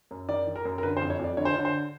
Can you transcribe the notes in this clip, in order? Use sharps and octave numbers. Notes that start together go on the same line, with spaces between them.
F#2
D#3 D5
D#3
A#4
F#2
A#4
D3 B4
C5
F2
C#5
F2 D5
D3 C#5
C5
D3 C#5
C5